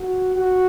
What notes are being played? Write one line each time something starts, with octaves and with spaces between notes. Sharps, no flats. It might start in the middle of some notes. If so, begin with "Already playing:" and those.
Already playing: F#4
F#4